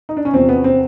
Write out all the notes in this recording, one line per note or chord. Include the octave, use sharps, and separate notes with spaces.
D#4
D4
C#4
E2 C3 F3 C4
B3
C4